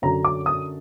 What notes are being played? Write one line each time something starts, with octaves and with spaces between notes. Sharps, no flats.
F#2 D3 F#3 A#5
D6
D#6